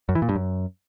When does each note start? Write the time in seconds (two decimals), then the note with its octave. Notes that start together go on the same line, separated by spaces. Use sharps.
0.09 F#2
0.15 E3
0.22 A#2
0.29 G2
0.35 F#2